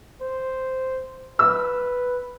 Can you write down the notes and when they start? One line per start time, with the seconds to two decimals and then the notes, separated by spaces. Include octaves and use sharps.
0.21 C5
1.39 B4 E6